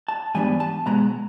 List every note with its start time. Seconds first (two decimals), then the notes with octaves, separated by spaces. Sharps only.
0.08 A5
0.35 G#2 E3 G3 B3 D4 G#5
0.60 A5
0.86 B2 G#3 B3 A#5